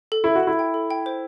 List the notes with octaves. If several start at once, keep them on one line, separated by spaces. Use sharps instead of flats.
A4
E4 A4
F#4
E4 A4
G5
A4
G5
C5